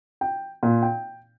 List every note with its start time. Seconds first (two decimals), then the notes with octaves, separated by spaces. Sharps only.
0.21 G5
0.63 A#2
0.82 G5